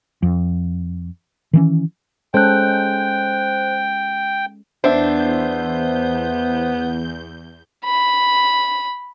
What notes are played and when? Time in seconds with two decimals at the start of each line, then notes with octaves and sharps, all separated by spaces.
0.22 F2
1.53 D#3 E3 C#4
2.34 G#3 C#4 A4 C5 G5 F#6
4.84 E2 B3 D4 C5 E5 G6
7.85 B5